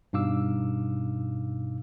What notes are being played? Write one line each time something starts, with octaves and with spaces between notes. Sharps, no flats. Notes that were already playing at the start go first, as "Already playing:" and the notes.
G2 B2 D#4 F5 D6 E6